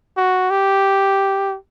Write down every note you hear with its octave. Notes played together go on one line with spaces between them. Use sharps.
F#4
G4